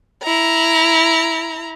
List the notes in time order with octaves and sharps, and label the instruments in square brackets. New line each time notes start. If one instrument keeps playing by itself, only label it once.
[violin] E4 A#5